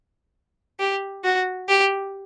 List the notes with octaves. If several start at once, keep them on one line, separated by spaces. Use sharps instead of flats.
G4
F#4
G4